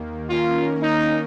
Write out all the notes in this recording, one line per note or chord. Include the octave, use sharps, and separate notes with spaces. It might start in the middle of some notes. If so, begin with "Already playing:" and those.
Already playing: D#2 D#3 A#3
D#3 A#3 C#4 F4 A#4
D#4